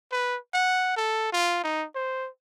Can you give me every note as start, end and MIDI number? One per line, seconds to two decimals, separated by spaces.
0.12 0.38 71
0.54 0.94 78
0.97 1.32 69
1.32 1.60 65
1.64 1.86 63
1.95 2.29 72